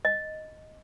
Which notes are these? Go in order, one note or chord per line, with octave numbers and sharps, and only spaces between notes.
D#5